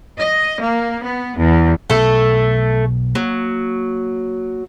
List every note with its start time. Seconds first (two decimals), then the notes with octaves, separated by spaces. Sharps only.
0.18 D#5
0.61 A#3
1.03 B3
1.37 E2
1.90 B1 B2 A3 B3 A4
3.15 F#3 A#3